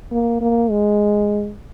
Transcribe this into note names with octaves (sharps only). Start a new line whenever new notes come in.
A#3
A#3
G#3